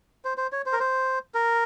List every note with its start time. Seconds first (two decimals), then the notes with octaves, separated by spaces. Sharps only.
0.25 C5
0.38 C5
0.52 C#5
0.66 C5
0.73 A#4
0.80 C5
1.34 A#4